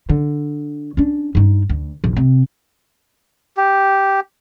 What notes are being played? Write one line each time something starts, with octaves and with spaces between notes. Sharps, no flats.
D3
C#4 D4
G2 D#4
D2
A#1 E2
C3
G4